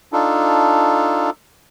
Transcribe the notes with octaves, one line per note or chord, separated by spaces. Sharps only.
D4 D#4 F4 A4